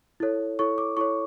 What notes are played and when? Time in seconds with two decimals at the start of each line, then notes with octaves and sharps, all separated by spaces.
0.20 E4 A4 C#5
0.59 E4 A4 C#5 C#6
0.78 D6
0.97 E4 A4 C#5 C#6